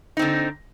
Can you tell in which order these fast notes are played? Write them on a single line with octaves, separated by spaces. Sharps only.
D#4 C4 D3